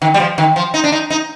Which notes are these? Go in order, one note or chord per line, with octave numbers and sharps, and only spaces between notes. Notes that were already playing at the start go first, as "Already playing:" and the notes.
D#3
G3
F3
D#3
F3
D#4
D4
D#4
D#4